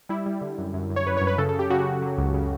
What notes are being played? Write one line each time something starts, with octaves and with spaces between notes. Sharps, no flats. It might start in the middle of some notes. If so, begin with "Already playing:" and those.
G3 E4
G3
D3
F#2
F#2
F#2
C#5
F#2 B4
C#5
F#2
B4
C#3 A4
A4
C#3 G4
C#3 F#4
C#3
F#3
C#2
C#3